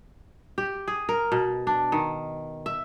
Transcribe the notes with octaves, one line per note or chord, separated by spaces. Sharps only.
G4
G#4
A#4
B2
D4
D#3
E5